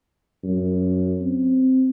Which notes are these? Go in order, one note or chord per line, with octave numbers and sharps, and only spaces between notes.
F#2
C4